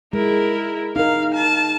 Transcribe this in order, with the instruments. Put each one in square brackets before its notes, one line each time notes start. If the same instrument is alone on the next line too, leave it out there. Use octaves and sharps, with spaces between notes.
[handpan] G#3 [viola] E4 A#4
[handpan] D#4 A#4 [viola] F5
[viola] A5